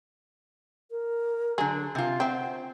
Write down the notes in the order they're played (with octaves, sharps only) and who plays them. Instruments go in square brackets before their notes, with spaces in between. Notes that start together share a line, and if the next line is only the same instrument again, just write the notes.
[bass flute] A#4
[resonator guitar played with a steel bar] D3 F#3 [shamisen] G#4
[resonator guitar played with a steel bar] C3 F4 [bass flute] C4
[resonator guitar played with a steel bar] C4 [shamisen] E5 G5 [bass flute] F#5